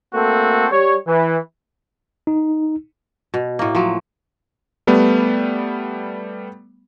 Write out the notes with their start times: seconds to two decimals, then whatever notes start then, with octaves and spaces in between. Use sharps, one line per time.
0.14 A3 A#3 C4 F#4 A4
0.72 G3 C#5
1.07 E3
2.27 D#4
3.34 B2
3.59 A2 A#3
3.75 F3 F#3
4.87 G3 A3 B3